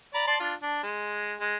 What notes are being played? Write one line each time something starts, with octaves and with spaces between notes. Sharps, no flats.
D5 A#5 B5
D5 A5 C6
D4 F4
D4
G#3
G#3